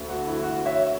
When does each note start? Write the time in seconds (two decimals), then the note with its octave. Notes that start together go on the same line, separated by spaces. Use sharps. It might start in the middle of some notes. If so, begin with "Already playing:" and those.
Already playing: D2 D3 A3
0.09 F#4
0.26 E4
0.43 F#4
0.66 C#5 E5